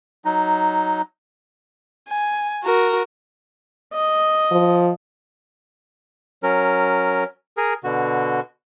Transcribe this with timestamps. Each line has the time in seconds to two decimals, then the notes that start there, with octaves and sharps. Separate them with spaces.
0.25 F#3 D#4
2.09 G#5
2.63 F#4 A#4
3.93 D#5
4.52 F3
6.43 F#3 C#4 A#4
7.57 G#4 A#4
7.84 B2 D3 F#4